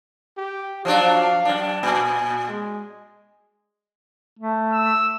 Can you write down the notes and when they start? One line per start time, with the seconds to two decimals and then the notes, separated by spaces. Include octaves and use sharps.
0.37 G4
0.85 F3 F#3 D4 F5
1.45 F#2 D4
1.83 A#2 G#5
2.48 G#3
4.39 A3
4.73 E6